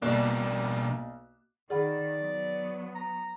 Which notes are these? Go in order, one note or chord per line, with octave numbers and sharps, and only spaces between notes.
B1 B2 G3 A#3 D4 D5 F#6
D#3 G#4 D5 F#5 B5
F#3 B3
A#5